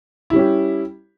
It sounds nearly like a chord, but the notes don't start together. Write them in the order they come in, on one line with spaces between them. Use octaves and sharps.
E4 G3 C#4 G4